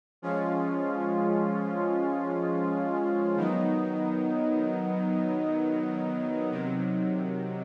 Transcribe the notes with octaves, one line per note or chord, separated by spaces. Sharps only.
F3 G#3 C#4 F4
D#3 F#3 B3 D#4
C3 D#3 F#3